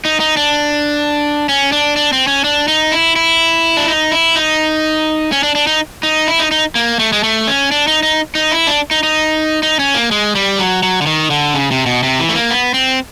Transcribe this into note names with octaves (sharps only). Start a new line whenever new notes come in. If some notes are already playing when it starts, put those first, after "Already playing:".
D#4
D#4
D4
C#4
D4
D4
C4
C#4
D4
D#4
E4
E4
D4
D#4
E4
D#4
C#4
D4
D4
D#4
D#4
E4
D#4
D#4
A#3
A3
G#3
A3
C#4
D4
D#4
D#4
D#4
E4
D4
D#4
D#4
D#4
C#4
A#3
G#3
G3
F#3
F#3
D3
D#3
D3
C#3
C3
B2
C3
E3
A3
A#3
B3
C4